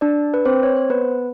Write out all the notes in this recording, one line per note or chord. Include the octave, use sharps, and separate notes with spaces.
D4 D5
B4
C4 C5
C#5
C5
B3 B4